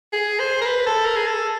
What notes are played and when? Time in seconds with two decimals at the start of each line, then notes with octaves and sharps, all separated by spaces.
0.13 G#4
0.39 C5
0.61 A#4
0.66 B4
0.86 A4
1.05 A#4
1.16 G#4
1.26 A4